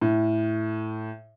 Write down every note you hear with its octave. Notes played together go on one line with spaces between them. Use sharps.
A2